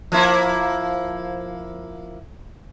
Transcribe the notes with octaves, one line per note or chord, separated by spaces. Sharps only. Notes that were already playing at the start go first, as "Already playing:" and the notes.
F3 A#3 E4